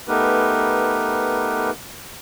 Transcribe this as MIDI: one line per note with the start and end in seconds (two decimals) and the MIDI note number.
0.08 1.70 57
0.08 1.70 59
0.08 1.70 63
0.08 1.70 67
0.08 1.70 70
0.08 1.70 71